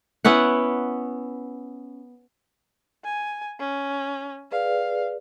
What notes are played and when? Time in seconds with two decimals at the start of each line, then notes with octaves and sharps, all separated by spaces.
0.25 B3 C#4 E4 F#5
3.04 G#5
3.59 C#4
4.51 G#4 B4 D5 F5